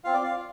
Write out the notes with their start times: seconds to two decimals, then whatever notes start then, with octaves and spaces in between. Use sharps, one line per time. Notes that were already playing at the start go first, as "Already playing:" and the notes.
0.04 C4 F4 F5
0.14 D5
0.24 F5
0.37 F4